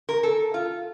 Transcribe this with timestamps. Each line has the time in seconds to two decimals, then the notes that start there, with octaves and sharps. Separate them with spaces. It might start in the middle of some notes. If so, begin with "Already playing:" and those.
0.09 A#4
0.23 A4
0.54 F4